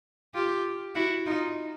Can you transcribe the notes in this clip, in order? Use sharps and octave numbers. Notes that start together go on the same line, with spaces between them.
F4 G4
E4 F#4
D#4 F4